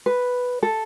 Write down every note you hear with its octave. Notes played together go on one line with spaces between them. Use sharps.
B4
A4